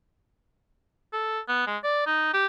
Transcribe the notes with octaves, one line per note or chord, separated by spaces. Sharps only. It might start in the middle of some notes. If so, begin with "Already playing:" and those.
A4
B3
G#3
D5
D#4
G4